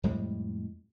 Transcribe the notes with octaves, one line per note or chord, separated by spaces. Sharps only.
F2 A2 G3 G#3